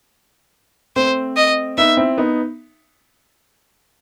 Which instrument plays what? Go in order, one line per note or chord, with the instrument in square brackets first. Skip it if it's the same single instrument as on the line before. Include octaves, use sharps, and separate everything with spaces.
[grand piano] A3 C4 [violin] C5
[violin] D#5
[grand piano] B3 D#4 [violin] E5
[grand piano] C4 E4
B3 D#4